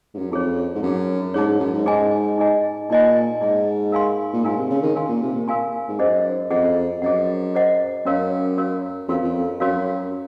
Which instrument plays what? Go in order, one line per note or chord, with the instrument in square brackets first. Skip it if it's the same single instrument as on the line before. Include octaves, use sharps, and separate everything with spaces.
[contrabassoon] G#2
F#2
[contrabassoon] F2 [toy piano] D#4 G#4 C#5
[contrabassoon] G#2
[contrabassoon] F#2 [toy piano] D#4 G#4 C#5
[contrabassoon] G#2 [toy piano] D#4 G#4 C#5
[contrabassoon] G#2
F#2
G#2
[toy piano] D#4 G#4 D#5 G#5
D#4 G#4 D#5 G#5
[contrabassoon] A#2 [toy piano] D#4 G#4 D#5 G#5
[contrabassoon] G#2 [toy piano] D#4 G#4 D#5 G#5
[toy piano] A#4 F5 G#5 C6
[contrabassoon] A#2
[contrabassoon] G#2 [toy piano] A#4 F5 G#5 C6
[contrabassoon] C3
C#3
D#3
[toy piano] A#4 F5 G#5 C6
[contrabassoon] A#2
C3
A#2
[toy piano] A#4 F5 G#5 C6
[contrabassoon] G#2
[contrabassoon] F#2 [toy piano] G#4 C5 D#5 F#5
[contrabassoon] F2 [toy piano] G#4 C5 D#5 F#5
[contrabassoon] F#2 [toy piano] G#4 C5 D#5 F#5
[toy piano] G#4 C5 D#5 F#5
[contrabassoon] F#2 [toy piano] C#4 F#4 A#4 C#5 F5
[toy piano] C#4 F#4 A#4 C#5 F5
[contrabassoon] F2 [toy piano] C#4 F#4 A#4 C#5 F5
[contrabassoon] F2
[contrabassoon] F#2 [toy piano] C#4 F#4 A#4 C#5 F5